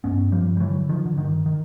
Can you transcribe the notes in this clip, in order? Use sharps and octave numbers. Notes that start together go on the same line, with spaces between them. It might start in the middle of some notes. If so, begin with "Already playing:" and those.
G2 B3 C#4
G2 F3 G3
G3
D3 E3 F#3
D3 D#3 F3
D3
G2 D#3
D#3